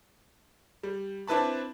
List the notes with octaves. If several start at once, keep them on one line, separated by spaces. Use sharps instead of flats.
G3
C4 D4 E4 B4 A5 B5